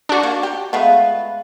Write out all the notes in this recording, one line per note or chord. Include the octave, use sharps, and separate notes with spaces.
D4 F#4
A#3
G4
G#3 A3 B3 F4 B4